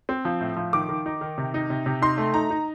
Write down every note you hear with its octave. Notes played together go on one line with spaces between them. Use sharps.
C4
F3
A2
F3
D#3 D6
D#3
D#4
D#3
C3
D#4
C3
C3
D#4 C6
A3
D#4 A#5
D#4